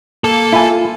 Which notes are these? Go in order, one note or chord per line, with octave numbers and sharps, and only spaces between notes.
A#3 A4
E4 F4 G#5